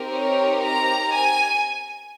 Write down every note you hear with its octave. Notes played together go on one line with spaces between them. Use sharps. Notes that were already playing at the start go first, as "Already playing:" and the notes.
Already playing: C4 D#4 G4 A#4
C#5
A#5
G#5